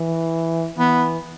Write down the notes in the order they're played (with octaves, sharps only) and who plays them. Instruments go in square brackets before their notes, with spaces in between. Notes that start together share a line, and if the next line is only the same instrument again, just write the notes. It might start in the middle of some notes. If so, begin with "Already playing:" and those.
Already playing: [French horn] E3
[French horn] E3 [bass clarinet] B3